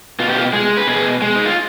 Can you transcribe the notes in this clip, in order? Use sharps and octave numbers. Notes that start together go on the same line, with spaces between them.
B2 F4
G4
F4
G#3 G#4
B4
B2 G#4
G#3
D#4
F4